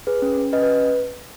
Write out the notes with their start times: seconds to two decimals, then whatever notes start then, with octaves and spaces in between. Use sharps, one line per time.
0.07 G#4 B4
0.22 C#4
0.37 C#4
0.53 C#4 B4 D#5
0.63 B4